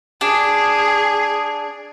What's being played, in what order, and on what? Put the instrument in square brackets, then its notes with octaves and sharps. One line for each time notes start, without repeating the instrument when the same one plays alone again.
[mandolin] D4 [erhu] G#4